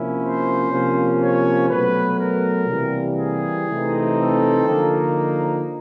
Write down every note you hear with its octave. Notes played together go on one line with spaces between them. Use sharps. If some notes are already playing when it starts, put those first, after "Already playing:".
Already playing: C3 F3 A#3 C#4 E4
C5
C3 F3 A#3 C#4
C#5
B2 F#3 A3 B4
A#4
C3 E3 G3 A#3
G#4
C3 E3 A3 C4 D#4
A4
D3 F3 A#3 D#4